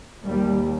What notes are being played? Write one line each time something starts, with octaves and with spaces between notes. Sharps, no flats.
D#2 G3